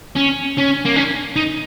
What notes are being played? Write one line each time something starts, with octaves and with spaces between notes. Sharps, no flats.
C#4
C#4
A#3
C#4
D#4